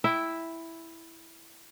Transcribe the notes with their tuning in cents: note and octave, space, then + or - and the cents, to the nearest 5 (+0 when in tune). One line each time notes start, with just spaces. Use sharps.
E4 +0 E5 +0 G5 +0